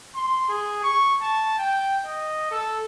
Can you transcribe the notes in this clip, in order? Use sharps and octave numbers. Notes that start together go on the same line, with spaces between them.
C6
G#4
C#6
A5
G5
D#5
A4